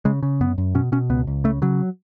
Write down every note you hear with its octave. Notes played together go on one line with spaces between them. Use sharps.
C#3 G#3
C#3
F#2 B3
F#2
B2 C#4
B2 C#4
C#2 B3
C#2
C#3 A3
C#3 F#3